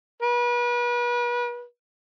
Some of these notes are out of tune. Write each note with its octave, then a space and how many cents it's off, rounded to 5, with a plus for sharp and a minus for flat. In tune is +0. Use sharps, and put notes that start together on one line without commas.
B4 -35